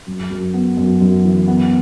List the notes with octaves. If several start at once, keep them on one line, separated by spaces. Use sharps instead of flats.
F#2
F#2
B3
F#2
F#2
E3
B3